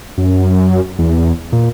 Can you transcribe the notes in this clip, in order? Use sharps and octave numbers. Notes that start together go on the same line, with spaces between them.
F#2
E2
A#2